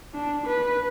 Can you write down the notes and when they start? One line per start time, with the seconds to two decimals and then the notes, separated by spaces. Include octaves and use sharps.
0.14 D4
0.47 B4